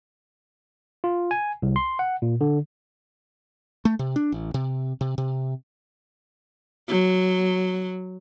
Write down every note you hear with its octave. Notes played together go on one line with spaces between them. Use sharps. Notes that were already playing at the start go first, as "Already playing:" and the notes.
F4
G#5
C2
C6
F#5
A#2
D3
A3
C3
D4
A1
C3
C3
C3
F#3